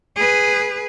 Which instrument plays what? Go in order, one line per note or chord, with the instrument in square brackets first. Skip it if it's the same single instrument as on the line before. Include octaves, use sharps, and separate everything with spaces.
[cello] G#4 B4